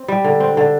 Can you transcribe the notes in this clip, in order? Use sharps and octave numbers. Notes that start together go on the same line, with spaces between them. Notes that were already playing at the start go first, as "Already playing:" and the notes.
Already playing: C4
G3
D3
C4
D3